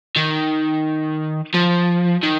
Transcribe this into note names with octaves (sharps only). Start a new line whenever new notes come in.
D#3
F3
D#3